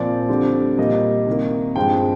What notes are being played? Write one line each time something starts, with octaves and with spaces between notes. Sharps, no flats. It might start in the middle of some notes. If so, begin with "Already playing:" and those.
Already playing: A#2 F3 C4 D5
D3 G3 C4
A#2 G3 A#3 D#5
C3 D#3 A#3
G2 F3 G#3 C4 G5